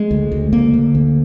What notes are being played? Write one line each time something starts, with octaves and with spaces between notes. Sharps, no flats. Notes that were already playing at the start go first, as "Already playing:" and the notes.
Already playing: G#3
D2
D2
D3 A#3
D3
D2